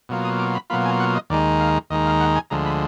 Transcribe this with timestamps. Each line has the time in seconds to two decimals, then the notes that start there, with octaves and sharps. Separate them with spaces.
0.09 B2 F#3 A#3 F4
0.24 D#6
0.39 D6
0.55 B5
0.70 B2 F#3 A#3 F4 B5
0.85 G#5
1.00 F#5
1.15 D#5
1.30 D#2 D#3 G#3 D#4 D5
1.60 F5
1.90 D#2 D#3 G#3 D#4 D#5
2.06 F5
2.21 F#5
2.36 G#5
2.50 D2 D3 F3 G#3 A#5
2.66 B5